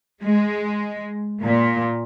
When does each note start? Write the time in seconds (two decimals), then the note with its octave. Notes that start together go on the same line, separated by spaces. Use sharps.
0.21 G#3
1.43 A#2